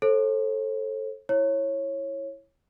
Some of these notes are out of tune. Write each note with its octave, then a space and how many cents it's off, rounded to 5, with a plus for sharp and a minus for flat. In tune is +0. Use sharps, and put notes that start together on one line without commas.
A4 +0 C5 +45
E4 +0 C#5 -15